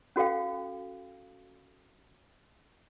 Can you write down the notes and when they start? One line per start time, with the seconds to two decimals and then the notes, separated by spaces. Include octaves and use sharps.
0.16 C#4 F#4 A4 F5 G5